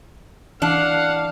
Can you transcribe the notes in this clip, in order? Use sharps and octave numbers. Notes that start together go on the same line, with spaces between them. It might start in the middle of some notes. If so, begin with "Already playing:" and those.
E3 D4 F5 F#5